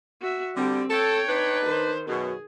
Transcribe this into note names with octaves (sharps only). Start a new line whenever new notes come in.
F#4 E5
D3 G3 C4 G4
A4 C#5 G5
D4 D#4 B4
D#3 C5
F#2 B2 G#4